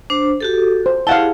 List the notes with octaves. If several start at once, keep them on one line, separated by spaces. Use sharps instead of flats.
D4 C5
F#4 G4 A4
C5
E4 G4 G#4 F5 F#5 A5